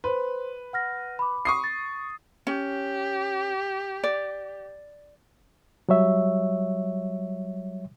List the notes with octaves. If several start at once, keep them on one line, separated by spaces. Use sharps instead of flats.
B4 C5 C6
F#5 F6 A#6
B5 D6
C#6 D#6 C7
A6
C#4 G4
D5
F#3 G3 C#5 E5